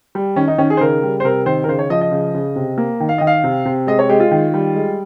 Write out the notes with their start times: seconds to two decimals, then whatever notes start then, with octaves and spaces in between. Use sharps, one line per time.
0.15 G3
0.36 D#3 C#4
0.48 D#4
0.58 D#3 C#4
0.70 G#4
0.77 C5
0.80 C#3 A#4
1.03 G3
1.20 C5
1.24 C3 A#4
1.46 D#3 C5
1.64 A#4
1.68 C#3 C5
1.79 C#5
1.90 F3 D#5
2.01 D#5
2.11 C#3
2.35 C#3
2.56 C3
2.78 A#3
3.00 D#3
3.09 F5
3.18 D#3 D#5
3.27 F5
3.44 C3
3.65 C3
3.87 G#3 D#5
3.99 C#5
4.09 G#3 G4
4.20 F4
4.31 D#3
4.54 G3
4.75 G#3